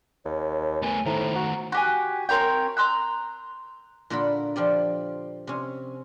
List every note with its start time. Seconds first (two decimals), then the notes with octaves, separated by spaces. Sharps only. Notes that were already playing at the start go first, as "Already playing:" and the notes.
0.25 D#2 C#5
0.82 A3 B3 G#5
1.06 A2 D#3 A3 C5 A#5
1.35 F#4
1.72 F#4 G4 G#5
2.29 C4 A#4 C#5 G5
2.77 A#5 C6 E6 F#6
4.10 A#2 D3 F4 A#4 F#5 B5
4.56 F3 F4 G4 D5
5.47 C3 C#4